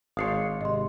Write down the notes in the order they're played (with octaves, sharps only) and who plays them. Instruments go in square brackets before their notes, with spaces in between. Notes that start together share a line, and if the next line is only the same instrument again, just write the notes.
[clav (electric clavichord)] G#1 D4 C#5 [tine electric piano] F5 C6 [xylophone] D#6 C7 C#7
[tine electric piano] G#2 C3 [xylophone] D#5 C6